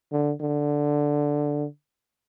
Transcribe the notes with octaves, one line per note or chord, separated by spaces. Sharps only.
D3
D3